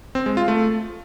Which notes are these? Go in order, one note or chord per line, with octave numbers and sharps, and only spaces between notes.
C4
G#3
F4
A3